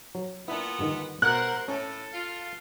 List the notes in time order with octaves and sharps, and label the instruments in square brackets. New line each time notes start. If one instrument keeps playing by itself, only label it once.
[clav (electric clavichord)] F#3
[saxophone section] A#2 B3 [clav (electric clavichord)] D4 E4
[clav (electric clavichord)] G2 D3 D#3
[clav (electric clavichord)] B2 [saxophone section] G3 F#5 [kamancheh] A#4 C5 [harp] F#6
[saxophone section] A2 [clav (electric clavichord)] C#4 [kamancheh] A4
[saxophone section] F4